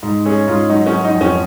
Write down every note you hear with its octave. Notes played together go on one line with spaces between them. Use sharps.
G#2
C#4 G#4
G#2 F4
F#3 D#4
C#4
F#3
D#4
F2
C#4